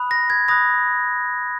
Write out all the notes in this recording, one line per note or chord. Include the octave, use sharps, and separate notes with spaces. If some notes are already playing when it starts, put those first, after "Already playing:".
Already playing: B5 D#6 F#6
A#6
G#6
B5 D#6 F#6 A#6